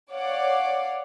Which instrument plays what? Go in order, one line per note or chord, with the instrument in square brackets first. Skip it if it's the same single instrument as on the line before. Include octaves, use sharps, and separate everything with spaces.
[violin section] C#5 D5 F5 F#5 D6